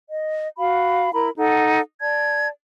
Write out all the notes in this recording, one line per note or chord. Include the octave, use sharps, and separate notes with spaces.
D#5
F#4 F5 B5
E4 A#4 A#5 B5
D#4 A4 F#5
D5 A5 G#6